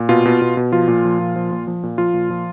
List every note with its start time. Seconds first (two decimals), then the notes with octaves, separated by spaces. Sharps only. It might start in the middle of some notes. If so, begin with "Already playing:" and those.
Already playing: A#2
0.09 B2 F4
0.25 B2
0.42 B2
0.57 B2
0.72 F3 F4
0.88 A#2
1.05 F3
1.20 A#2
1.36 F3
1.52 A#2
1.67 F3
1.83 A#2
1.98 F3 F4
2.14 A#2
2.30 F3